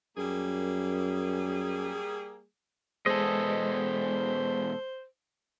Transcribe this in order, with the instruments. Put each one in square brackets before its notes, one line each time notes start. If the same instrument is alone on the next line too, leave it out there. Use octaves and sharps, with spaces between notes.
[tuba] F#2 [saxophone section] G3 A#3 G#4
[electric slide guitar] E2 B2 G#4 [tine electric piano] G#3 [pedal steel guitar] A4 D#5 [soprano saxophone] C5